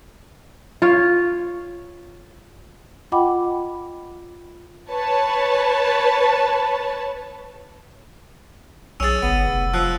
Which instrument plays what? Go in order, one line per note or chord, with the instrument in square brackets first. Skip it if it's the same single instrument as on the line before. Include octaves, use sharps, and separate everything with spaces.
[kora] F4 C#5
[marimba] F4 D#5 F#5 G5 B5 D6
[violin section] B4 C#5 A5
[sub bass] B1 [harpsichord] C#4 G#4 [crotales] E6 A6
[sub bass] G1 [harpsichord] B3
[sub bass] F1
[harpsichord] F3 [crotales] E6 F#6